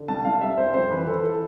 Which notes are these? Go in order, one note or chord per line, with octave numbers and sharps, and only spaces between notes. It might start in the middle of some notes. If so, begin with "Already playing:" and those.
Already playing: D3
C2 A5
C2 F5
G3 E5
C2 C5
F2 C5
E3 B4
E3 A4
A4